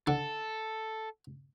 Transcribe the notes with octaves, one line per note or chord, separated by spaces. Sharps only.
D3 A4